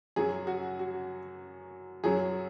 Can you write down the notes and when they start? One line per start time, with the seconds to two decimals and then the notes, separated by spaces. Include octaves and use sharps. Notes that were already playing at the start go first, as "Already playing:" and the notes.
0.16 F#2 F#3 G#4
0.47 F#4
0.79 F#4
2.04 F#2 F#3 G#4